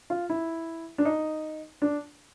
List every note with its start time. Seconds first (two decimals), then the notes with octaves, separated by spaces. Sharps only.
0.10 F4
0.30 E4
0.98 D4
1.05 D#4
1.82 D4